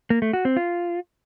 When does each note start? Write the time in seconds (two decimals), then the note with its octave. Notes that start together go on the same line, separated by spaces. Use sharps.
0.10 A#3
0.22 A3
0.33 F#4
0.45 C4
0.57 F4